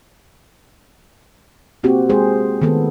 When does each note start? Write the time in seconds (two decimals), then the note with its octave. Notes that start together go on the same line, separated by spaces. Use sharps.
1.84 A#3 C4 F#4 G4
2.09 G#3 G#4 C5
2.62 D#3 A3 B3 A4